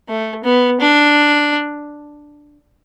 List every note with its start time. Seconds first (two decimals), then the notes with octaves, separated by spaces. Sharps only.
0.08 A3
0.44 B3
0.80 D4